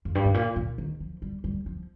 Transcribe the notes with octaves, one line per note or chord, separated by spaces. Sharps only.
F2
G2
G#2
A#2
A#2
D#3
F3
G3
G3
F3